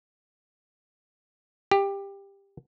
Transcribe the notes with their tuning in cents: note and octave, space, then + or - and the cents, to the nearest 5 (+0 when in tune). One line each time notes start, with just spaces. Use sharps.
G4 +15